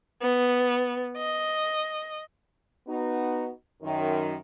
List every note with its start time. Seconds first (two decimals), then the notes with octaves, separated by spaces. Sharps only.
0.22 B3
1.17 D#5
2.88 B3 D#4 F#4
3.83 F#2 D#3